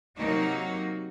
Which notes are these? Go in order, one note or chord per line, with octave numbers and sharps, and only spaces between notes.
C3 F#3 A#3 D#4 F#4